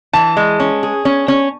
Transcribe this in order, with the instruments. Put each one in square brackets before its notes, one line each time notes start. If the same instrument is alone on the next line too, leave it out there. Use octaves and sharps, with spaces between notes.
[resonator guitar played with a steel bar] E3 [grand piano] A5
[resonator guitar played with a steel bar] G#3
C#4
G#4
C#4
C#4